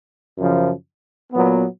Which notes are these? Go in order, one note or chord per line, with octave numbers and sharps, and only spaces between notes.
F#2 C#3 F3
A#2 F#3 B3